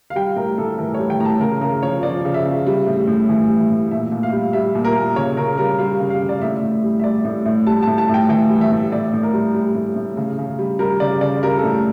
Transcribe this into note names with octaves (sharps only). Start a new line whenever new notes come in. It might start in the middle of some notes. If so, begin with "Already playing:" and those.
F5
G3 G5
A2 A#4
A2 A4
E3 A#4
G3 C#5
G5
A2 A#5
A5
C#3 A#4
C#3 A#4
F3 C#5
F3 D5
C#3
E5
C#3
G3
A2
A2
E3
G3
A2
A#2 E5
A#2
F5
G3
G3 E5
A#2
A#4
A#2
C#3 C#5
C#3 A#4
G3 A#4
G3 F5
C#3
F5
C#3
D5
A2 E5
A2
G3
E5
G3 D5
A2
A2
G3 A5
A2 A5
A5
A2 G5
E3 G5
G3
E5
A2
A2 D5
A2
A#4
G3
G3
A2
A2
C#3
C#3
G3
G3 A#4
C#3 D5
C#3 D5
G3 A#4
A4
A2